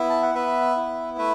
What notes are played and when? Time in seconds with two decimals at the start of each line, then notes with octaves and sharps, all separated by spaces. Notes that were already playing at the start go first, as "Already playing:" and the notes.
Already playing: B3 E4 E5
0.10 A5
0.23 F#5
0.35 B3 B4 E5
0.77 E4
1.18 A3 B4 E5